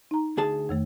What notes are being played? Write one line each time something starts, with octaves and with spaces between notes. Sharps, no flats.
D#4 A#5
D2 G#4 A5
F2 D#3 A3